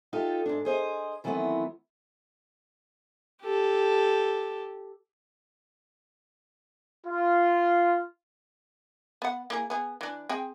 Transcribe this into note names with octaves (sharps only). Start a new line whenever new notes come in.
D#4 F4 G4 A4
G#2 D4
G#4 C5 D#5
D#3 E3 F#3 A3 B3 C4
G4 A4
F4
B3 F#5
A#3 E4 G#4
B3 G#4
E3 D4
C4 G#4 G5